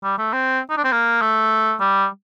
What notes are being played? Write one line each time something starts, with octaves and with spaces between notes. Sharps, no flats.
G3
A3
C4
D#4
D4
C4
A#3
A3
G3